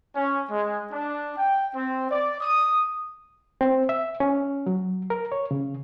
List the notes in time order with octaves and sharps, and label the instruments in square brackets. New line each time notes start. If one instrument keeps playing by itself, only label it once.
[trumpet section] C#4
G#3
D4
G5
C4
D5
D#6
[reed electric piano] C4
E5
C#4
F#3
A#4
C#5
C#3